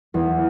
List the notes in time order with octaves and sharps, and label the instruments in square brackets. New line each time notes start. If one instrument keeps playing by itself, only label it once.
[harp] E2